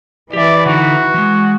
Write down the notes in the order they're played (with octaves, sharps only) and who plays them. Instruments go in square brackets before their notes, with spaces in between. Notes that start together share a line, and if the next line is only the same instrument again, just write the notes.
[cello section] E3 [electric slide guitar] G4 E5 [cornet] D5
[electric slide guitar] D3 D#4 [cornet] F#4
[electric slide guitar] E3 G#3